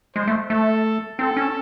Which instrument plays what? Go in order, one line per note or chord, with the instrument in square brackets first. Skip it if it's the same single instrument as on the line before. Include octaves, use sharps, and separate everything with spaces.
[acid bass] G#3 [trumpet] C5
[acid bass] A3
[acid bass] A3 [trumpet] A4
[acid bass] C4 [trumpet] A4
[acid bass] C#4